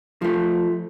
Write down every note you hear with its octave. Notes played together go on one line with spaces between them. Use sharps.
F3 A3